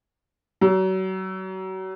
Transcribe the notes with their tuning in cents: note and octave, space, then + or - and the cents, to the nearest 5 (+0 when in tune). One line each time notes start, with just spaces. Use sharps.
F#3 +35